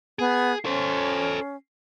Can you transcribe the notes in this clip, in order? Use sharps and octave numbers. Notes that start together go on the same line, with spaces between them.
B3 G#4
C#4 A4 C5